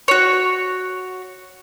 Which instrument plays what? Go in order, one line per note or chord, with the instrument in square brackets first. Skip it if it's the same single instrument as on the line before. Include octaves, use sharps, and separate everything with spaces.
[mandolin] F#4 C#5